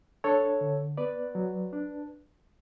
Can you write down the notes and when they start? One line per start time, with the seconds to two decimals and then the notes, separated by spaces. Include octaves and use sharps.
0.24 D4 A4 C#5
0.61 D3
0.97 B3 B4 D5
1.35 F#3
1.73 D4